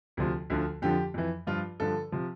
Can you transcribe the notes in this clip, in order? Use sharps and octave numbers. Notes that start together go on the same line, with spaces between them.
D2 C3 F3
D2 D3 F3
F2 D3 F3 G4
F2 E3
G2 F3 F4
G2 D3 F3 A4
C3 F3